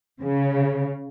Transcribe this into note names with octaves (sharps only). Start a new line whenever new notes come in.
C#3